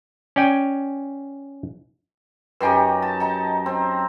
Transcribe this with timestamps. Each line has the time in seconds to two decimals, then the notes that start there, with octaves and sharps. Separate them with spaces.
0.36 C#4 D5 G5 G#5
2.61 F#2 D#4 G4 B4 G5 G#5
3.02 A5
3.20 D#4 A5
3.66 C4